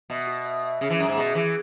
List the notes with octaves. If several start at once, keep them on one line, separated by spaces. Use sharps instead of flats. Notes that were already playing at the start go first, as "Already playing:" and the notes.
B2 E5
F#4
E5
E5
C#3 G#4
E3
F#2 E5
G#2
B2 G#4
E3 G#4